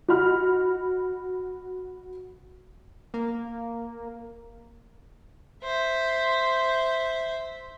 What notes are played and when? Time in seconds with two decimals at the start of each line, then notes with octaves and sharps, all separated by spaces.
0.08 F#4 D#5 B5 F6
3.14 A#3
5.63 C5 E5